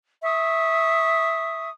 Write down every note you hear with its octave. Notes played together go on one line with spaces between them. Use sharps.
E5 C#6 D#6